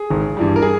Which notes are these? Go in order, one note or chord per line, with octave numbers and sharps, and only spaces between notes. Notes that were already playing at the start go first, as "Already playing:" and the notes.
Already playing: G#4
G#1
G2 E3 G3
A#4
G#4